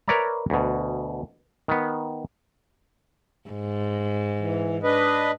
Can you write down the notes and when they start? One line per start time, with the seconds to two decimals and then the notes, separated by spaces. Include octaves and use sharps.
0.08 A#4 B4 C#5 D5 E5 A#5
0.50 D2 B2
1.68 D#3 B3
3.49 G#2
4.39 E3
4.83 D4 B4 D#5